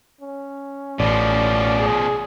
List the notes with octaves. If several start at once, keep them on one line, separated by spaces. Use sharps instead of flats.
C#4
A1 B2 F3 D5
G#4